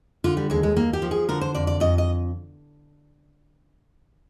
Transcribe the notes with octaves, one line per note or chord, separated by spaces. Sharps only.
D3 F4
G3
D#2 G#3
G#3
D#2 A#3
G4
F3
G#4
D3 A#4
C5
F2 D5
D5
F2 D#5
D#5